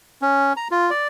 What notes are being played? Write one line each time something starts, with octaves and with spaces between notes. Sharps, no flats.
C#4
A#5
F4
D5